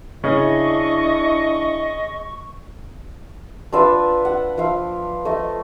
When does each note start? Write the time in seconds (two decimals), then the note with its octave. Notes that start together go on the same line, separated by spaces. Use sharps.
0.24 C#3 D4 E4 D#5 C#6
3.73 D4 F4 B4 E5
4.25 F#5
4.58 F3 E5 F5
5.25 A3 D#5